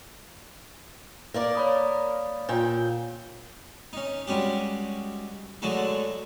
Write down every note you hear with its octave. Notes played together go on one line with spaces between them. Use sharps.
A#3 A#4 D5
C#5 B5 D#6
A#2 G5
C#4 D#4
G3 G#3 C#4 F#4 G4
D3 F#3 G#3 A3 F#4 A4